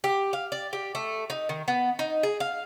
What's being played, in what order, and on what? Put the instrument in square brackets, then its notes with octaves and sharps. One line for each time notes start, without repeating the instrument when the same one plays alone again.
[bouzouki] G4
F5
D5
G4
A3
D#4
D#3
B3
D#4
G#4
F5